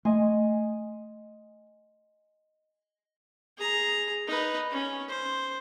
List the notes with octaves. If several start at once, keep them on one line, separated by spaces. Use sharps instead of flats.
A3 D#5 G#5 C6
G#4 A#5
D#4 B4
C#4
C5